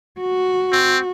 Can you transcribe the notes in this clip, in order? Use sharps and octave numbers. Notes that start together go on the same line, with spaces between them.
F#4
C4